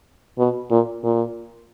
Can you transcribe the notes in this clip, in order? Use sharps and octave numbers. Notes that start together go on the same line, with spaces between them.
B2
A#2
A#2